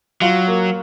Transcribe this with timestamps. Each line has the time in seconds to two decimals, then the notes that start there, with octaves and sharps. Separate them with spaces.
0.21 F#3 F4
0.48 A#3